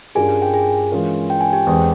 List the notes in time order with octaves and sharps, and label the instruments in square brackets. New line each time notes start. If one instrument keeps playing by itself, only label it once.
[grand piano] G2 G3 C#4 F4 A#4 [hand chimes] G#4 G#5
[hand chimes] G5
G#4 G#5
[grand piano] E3 G#3 C#4 F4 A#4
[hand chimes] G5
G#5
G4 G5
[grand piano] E2 E3 G#3 C4